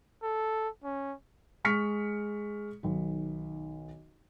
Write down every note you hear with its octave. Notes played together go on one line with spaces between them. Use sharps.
A4
C#4
G#3 C#6 F6 B6 C#7
B1 D#3